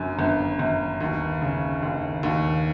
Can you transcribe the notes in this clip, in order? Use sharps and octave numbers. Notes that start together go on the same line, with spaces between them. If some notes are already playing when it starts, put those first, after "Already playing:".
Already playing: G1 F#2
G1
G1
D#2
C#3
D#2
D#2